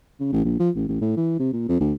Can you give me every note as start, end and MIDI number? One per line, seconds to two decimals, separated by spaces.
0.20 0.29 49
0.33 0.43 33
0.45 0.57 34
0.60 0.70 53
0.76 0.84 33
0.89 0.98 33
1.01 1.14 45
1.17 1.35 52
1.40 1.53 48
1.53 1.65 46
1.69 1.80 41
1.80 1.93 38